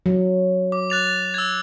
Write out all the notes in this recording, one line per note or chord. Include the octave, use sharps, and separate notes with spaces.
F#3
D6
F#6 A6 F7
E6 G#6